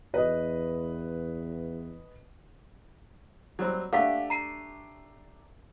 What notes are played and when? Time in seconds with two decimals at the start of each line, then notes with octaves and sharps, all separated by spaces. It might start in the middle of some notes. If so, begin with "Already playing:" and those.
0.14 E2 B4 D#5
3.59 F#3 G3 C4
3.93 A3 D4 G4 F5 F#5 B6
4.30 A#5 C7 D#7